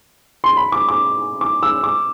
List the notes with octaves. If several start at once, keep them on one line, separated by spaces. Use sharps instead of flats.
C6
B5
D6
D6
D6
E6
D6